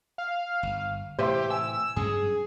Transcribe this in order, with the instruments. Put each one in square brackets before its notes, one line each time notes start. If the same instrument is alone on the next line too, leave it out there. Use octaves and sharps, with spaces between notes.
[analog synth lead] F5
[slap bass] G1
[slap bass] A2 C3 E3 [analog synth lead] G4 [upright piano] C5 E5 C6
[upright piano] G#5 [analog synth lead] E6
[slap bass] G2 F#3 C#4 [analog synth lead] G#4